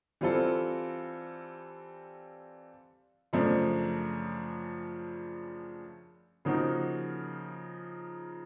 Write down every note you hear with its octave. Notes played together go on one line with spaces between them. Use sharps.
E3 G3 C4 F4 A4
F#2 C#3 F3 A3 D4
C#3 F3 A#3 D#4 F#4